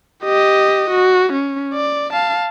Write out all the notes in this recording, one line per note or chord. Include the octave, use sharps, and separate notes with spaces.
G4 D#5
F#4
C#4
D5
F5 A5